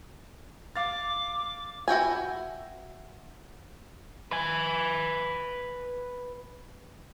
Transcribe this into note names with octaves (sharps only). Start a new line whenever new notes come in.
F5 D6 A6
E4 F#4 G5 G#5
B4 G#5